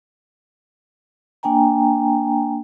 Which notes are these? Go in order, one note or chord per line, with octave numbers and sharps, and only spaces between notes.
A#3 D4 G5 G#5 A#5